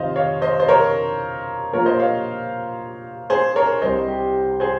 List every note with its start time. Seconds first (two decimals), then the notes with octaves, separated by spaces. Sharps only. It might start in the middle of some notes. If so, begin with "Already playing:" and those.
Already playing: F2 C3 D#3 C5 D#5 F5
0.16 C#5 F5
0.42 C5 D#5
0.60 C5
0.68 A#4 C#5
1.73 A#2 F3 A#3 F4 A#4 C#5
1.86 C5 D#5
1.99 C#5 F5
3.30 G#4 C5
3.56 A#4 C#5
3.82 C2 C3 G3 C5 D#5
4.08 G4
4.60 G#4 C5